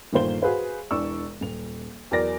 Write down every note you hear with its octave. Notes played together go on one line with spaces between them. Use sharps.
G1 A#2 D#3 A#3 C5 G7
F#4 G#4 B4 C5 F5
E1 E3 D4 D5 C#6 E6
D#1 F7
E2 F#3 A#4 D5 A#6